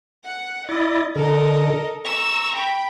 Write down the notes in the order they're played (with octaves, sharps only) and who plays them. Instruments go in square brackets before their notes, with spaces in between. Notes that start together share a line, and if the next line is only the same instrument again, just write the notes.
[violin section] F#5
[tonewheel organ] E4 D5 [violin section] D#5
[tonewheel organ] D3 [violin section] A4 A#4 D#5
[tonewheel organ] A#5 C#6 [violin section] E6
[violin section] G5 B5